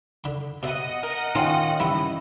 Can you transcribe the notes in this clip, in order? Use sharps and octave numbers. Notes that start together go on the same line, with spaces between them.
D3 B5
B2 D#5 E5 F#5 D#6
A#4
D#3 C#4 E4 F4
G2 E3 E4